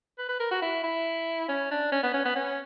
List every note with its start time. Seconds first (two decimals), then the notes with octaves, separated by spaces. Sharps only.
0.18 B4
0.29 B4
0.40 A#4
0.51 F#4
0.62 E4
0.84 E4
1.49 C#4
1.71 D4
1.92 C#4
2.03 B3
2.14 C#4
2.25 B3
2.36 C#4